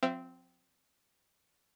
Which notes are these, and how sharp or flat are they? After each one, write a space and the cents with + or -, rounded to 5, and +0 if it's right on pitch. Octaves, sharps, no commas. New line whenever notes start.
F3 +35 C4 -10 E5 +35